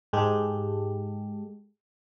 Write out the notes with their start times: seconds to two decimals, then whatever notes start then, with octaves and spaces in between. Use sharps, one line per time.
0.13 G#2 G#3 G4 A4